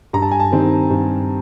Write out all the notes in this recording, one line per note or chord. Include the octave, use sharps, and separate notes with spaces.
G2 A#5
A5
G#5
A5
D#3 G3 C4 D#4
G2